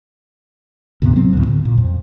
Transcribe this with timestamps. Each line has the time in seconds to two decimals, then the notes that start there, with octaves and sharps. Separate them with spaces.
1.02 D2 G#2 C3 B3
1.16 F#3 B3 C4
1.33 D2 A2
1.47 D3
1.65 A#2
1.78 F2